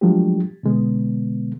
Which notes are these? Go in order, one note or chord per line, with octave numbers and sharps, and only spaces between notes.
F3 F#3 G#3 A3 D4 G4
B2 D3 G#3 B3